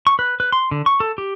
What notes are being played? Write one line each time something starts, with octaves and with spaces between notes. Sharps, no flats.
C#6
B4
B4
C6
D3
C#6
A4
G4